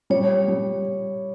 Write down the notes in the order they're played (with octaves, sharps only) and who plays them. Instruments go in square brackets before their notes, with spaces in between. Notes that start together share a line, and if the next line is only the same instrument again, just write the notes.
[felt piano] G3 [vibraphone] C#5
[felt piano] G3